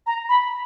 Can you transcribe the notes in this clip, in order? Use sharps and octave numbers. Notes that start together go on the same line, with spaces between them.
A#5
B5